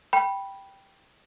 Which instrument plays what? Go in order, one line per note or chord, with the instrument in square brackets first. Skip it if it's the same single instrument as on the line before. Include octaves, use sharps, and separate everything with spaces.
[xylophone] G5 B5